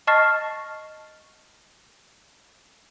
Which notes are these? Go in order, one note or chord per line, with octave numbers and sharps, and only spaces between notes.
D#5 A5 C#6 F6 A6 C7